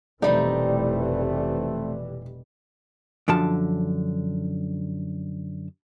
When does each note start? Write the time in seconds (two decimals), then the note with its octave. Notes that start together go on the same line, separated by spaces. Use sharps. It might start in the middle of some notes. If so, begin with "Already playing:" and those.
0.22 F1 B2 E3 G3 A3 C4 D#4 D5
3.28 F#2 D3 F3 A5